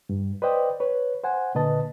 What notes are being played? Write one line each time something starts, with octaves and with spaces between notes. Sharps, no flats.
G2
B4 C5 D5 D#5 G5
B4 C#5
C5 F#5 G#5
A#2 D3 B4 D#5 A5